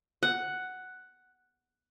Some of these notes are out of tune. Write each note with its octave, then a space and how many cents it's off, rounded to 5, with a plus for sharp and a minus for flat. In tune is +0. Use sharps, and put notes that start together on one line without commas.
F#5 +5